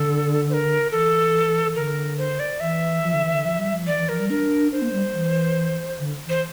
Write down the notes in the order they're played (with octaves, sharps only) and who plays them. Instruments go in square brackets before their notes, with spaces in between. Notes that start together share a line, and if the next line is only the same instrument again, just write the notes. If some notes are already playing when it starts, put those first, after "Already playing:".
Already playing: [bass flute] D3 [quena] A4
[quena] C5
A#4
[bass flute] E3 [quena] A4
[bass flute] D3 [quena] A#4
[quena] C5
D5
[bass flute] E3 [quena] E5
[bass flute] F3
D3
E3
D3
F3
G3
F3
[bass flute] E3 [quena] D5
[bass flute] E3
[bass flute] F3 [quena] A#4
[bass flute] G3
[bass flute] D4 [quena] A#4
[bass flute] D4 [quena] C5
[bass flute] A#3
G3
E3
D3
[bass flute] E3 [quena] C5